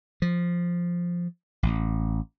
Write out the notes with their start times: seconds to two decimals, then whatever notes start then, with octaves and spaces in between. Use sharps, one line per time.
0.22 F3
1.63 A1